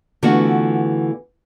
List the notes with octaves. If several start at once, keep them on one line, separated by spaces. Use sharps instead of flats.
D3 E3 A3 B3 F4 F#4